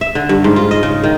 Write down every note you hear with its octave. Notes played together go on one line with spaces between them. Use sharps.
E5
D3
G2
G#2
F4
D#5
C#3
D#3